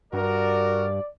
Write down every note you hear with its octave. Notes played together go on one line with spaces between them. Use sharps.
G2 F#4 A#4 D5